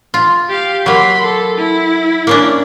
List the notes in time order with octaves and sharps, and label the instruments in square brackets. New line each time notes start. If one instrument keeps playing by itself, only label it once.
[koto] F4
[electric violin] G4 F5
[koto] F#3 A#3 [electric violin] B5 C6
[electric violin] A4
E4
[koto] A#3 C#4 D4